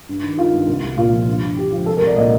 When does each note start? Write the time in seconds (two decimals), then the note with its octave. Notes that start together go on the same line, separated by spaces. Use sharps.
0.09 G2
0.23 D#3
0.37 D#3 F4
0.53 G2
0.68 C2
0.83 C2
0.97 A#2 F4
1.12 F3
1.27 G2
1.42 G2
1.56 D3 G4
1.72 F3
1.86 C2 A4
1.97 A#4
2.02 C2 D5
2.16 A#2 D#5